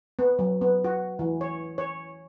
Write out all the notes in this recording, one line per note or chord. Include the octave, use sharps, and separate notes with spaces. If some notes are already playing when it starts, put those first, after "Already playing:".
B3
F#3
B3
F#4
E3
C#5
C#5